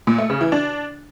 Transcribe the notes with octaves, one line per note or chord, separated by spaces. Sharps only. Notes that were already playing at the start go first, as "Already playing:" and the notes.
A#2
A3
C#3
E3
D4